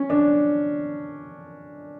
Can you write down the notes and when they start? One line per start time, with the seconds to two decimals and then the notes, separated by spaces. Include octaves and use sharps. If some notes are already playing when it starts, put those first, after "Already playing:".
Already playing: C#4
0.10 D4